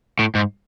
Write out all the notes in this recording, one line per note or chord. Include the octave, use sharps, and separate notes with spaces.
A2
G#2